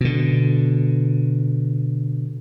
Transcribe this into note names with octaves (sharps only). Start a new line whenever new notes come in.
B2 D3